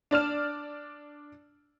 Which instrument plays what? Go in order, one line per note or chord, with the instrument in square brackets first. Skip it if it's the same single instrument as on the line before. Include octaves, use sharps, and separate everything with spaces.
[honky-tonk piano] D4 D5 F6 E7